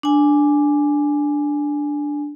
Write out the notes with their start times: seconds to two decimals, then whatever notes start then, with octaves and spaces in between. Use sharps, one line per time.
0.03 D4 G#5